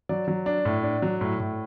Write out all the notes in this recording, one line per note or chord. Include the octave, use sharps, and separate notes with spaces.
F#3 D5
F#3
D4
A2
D4
F#3
A2
A2